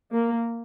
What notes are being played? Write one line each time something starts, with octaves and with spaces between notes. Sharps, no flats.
A#3